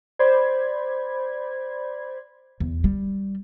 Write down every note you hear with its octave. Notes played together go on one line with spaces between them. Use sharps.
C5 D5 B5 G#6
E2
G3